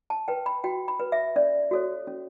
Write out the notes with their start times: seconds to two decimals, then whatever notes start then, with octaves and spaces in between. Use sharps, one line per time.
0.10 A5
0.28 B4 G5
0.46 B5
0.64 F#4 G5
0.88 B5
0.99 B4
1.12 E5
1.36 C#4 D5
1.71 F#4 A4 C#5
2.07 C#4